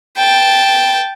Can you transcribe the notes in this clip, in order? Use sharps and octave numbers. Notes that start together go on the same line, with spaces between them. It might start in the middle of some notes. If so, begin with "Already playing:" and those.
G5 A5